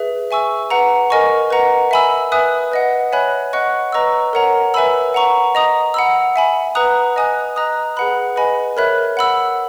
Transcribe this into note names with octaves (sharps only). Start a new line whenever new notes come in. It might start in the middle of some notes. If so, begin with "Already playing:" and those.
Already playing: G#4 B4 E5
E5 G#5 C#6 E6
B4 F#5 A#5
A#4 D#5 G#5 C#6
B4 D#5 F#5 A#5
E5 G#5 B5 E6
B4 E5 G#5 D#6 F#6
B4 D#5 F#5
C#5 E5 G#5 B5 F#6
D#5 F#5 C#6 F#6
B4 D#5 A#5 C#6 E6
A#4 C#5 F#5 A#5
B4 E5 G#5 B5 E6
F#5 A#5 C#6
D#5 A#5 D#6
F#5 B5 E6
E5 G#5 B5
B4 F#5 A#5 D#6 F#6
D#5 G#5 D#6 F#6
D#5 A#5 D#6 F#6
G#4 B4 F#5 B5 F#6
B4 D#5 G#5 B5
A#4 C#5 E5 B5 F#6
F#5 B5 E6